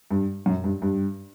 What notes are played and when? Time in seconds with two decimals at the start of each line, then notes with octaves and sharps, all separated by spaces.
0.11 G2
0.46 F#2
0.64 G2
0.82 G2